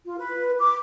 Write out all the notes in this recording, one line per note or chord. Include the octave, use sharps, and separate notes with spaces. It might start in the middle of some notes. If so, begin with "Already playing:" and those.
F4
B4
D6